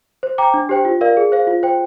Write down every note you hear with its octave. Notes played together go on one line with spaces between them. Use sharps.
C5
G5 A#5 D6
D4
G4 C5 G5
F4
A#4 D5 F5
G#4
C5 F5
F4
C5 G5